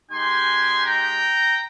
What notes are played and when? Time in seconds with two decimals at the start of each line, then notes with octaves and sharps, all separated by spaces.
0.11 G#3 D#4 G4 G#5 C6
0.84 G5 A#5